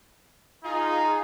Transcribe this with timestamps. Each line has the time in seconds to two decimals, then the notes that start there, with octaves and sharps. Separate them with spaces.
0.64 D#4 F4 G#4